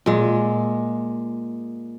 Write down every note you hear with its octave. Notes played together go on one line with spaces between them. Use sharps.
A#2 G#3